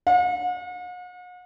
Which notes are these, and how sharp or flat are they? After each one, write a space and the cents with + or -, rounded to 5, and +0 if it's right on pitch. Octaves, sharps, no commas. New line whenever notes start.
F#5 -45